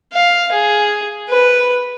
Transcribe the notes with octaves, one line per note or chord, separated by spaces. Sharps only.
F5
G#4
B4